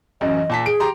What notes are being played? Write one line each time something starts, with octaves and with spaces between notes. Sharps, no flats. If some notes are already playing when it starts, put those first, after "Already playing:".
A1 F#2 D#5
A#2 A5 B6
G#4 D7
G4 A#5 C6